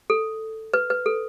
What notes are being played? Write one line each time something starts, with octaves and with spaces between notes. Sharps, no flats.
A4
B4
B4
A4